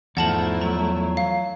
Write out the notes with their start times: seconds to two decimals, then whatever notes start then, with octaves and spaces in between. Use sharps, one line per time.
0.17 E2 G#2 F3 A3 E4 F#5 A5 F#7
0.61 F#3 A#5
1.17 F5